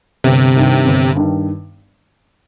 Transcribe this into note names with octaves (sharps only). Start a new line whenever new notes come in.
G1 C3
G2 D#3
G1
G2 D#3